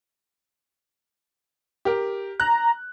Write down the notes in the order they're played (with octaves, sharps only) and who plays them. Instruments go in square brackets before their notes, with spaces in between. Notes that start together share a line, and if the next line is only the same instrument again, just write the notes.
[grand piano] G4 A#4
[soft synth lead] A#5 [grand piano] F#6